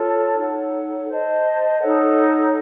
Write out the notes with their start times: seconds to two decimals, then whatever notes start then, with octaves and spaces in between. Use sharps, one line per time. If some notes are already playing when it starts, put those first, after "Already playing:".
Already playing: F4 A4 C#5 A5
0.37 D#4 A4 C#5 F#5
1.09 C5 D#5 A5
1.80 D#4 A4 C#5 F#5